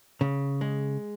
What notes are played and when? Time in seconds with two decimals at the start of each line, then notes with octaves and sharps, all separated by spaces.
0.21 C#3
0.61 G#3